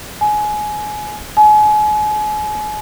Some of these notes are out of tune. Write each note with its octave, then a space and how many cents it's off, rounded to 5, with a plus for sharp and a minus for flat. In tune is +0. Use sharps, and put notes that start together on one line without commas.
G#5 +20
G#5 +35